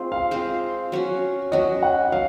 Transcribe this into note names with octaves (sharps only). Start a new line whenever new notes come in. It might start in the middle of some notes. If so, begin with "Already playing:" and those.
Already playing: G#3 C4 F4 C5
F5
G#3 C4 F4 C5
F#3 C#4 F#4
F#3 C#4 F#4 D#5
F#5
F#3 F5